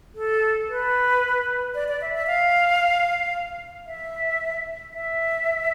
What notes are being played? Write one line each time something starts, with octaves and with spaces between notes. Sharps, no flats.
A4
B4
D5
D5
E5
E5
F5
E5
E5